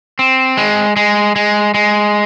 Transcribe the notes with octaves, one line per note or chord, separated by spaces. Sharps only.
C4
G#3
G#3
G#3
G#3